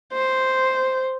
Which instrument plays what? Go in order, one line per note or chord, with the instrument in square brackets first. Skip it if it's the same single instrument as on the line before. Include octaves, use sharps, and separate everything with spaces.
[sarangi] C5